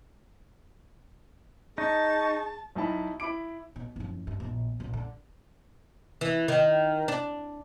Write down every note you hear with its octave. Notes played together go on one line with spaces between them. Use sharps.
D#4 G#4 A5 C#6
B1 D#4 E4 A5 B5
E4 B5 D6 D7
B2
F#1 F2
G2
A#1 B2
A#1 D3
D3
E3
D#3
D4